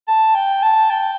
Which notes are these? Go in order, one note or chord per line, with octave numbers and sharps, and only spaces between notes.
A5
G5
A5
G5